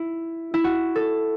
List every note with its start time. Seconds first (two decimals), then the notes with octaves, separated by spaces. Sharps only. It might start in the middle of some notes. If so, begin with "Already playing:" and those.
Already playing: E4
0.54 E4
0.64 F#4
0.96 A4